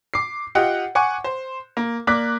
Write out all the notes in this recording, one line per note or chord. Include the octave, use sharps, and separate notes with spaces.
D6 C7
F4 G4 D#5 F#5 G5
F#5 G#5 C#6 D6
C5
A#3
A#3 D5 D6 F#6 B6